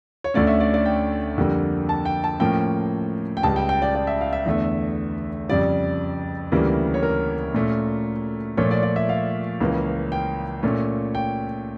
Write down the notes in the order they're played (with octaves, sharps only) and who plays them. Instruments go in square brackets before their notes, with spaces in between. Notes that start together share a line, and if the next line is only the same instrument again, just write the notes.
[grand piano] C#5
D2 D3 A3 C#4 D5
E5
D5
D5
G5
F2 D3 G3 A#3
A5
G5
A5
A2 F3 A#3 C#4 G5
G5
C#2 C#3 G3 A5
G5
G5
D5
D5
E5
F5
E5
E2 D3 A3
F2 C#3 G3 D5
D2 C#3 E3 G3 A#3
C#5
A#4
A#2 A3 C#4
A#2 F3 A3 C#5
D5
D5
E5
F5
C#2 C#3 E3 A#3 C#4
G5
A#2 A3 C#4
G5